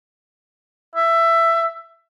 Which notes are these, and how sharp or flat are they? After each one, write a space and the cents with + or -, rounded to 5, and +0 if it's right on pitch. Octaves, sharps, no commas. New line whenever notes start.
E5 +15